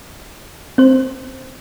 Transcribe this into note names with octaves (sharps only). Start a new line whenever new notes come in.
C4 C5